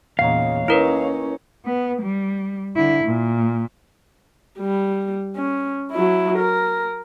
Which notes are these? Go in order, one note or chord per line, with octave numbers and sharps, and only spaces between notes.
E2 A#2 C#3 D#4 C#5 F5 F#5
A#3 C#4 D#4 E4 A#4 B4 C#5
B3
G3
D3 E4
A#2
G3
C#4
F#3 E4
A#4